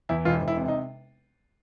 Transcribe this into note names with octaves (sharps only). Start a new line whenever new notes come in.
E2 E4
E1 F4
E1
E4
C3
D#4